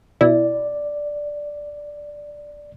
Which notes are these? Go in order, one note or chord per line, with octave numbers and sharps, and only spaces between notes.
B2 E4 D5